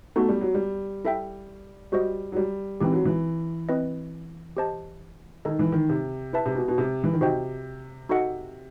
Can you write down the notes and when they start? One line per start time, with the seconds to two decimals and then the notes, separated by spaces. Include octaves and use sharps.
0.16 A3 B3 D#4 F#4
0.29 G3
0.41 F#3
0.54 G3
1.05 E4 A4 E5 G5
1.92 G3 F#4 C5 D#5
2.32 F#3
2.36 G3
2.80 E3 C4 D#4 G4
2.92 F#3
3.05 E3
3.69 C4 E4 B4 D#5
4.57 G4 C5 D#5 A5
5.45 D#3 D#4 A4 D#5
5.59 E3
5.72 D#3
5.89 C3
6.33 E4 B4 E5 A5
6.46 C3
6.55 B2
6.68 B2
6.78 C3
7.04 E3
7.13 D#3
7.21 C3 F#4 C5 D#5 G5
8.09 D#4 F#4 A4 D#5 F#5